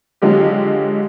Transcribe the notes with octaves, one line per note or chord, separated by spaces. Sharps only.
D3 F#3 G#3 F4 G4